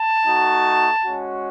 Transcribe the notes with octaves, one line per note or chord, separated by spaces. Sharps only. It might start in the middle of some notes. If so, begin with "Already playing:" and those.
Already playing: A5
A3 D#4 F#4
G#3 C#4 F#4